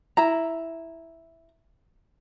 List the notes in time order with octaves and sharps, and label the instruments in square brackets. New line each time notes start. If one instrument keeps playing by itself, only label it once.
[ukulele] E4 A#5